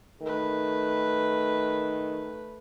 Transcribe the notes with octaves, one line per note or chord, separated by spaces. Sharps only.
D#3 A3 B4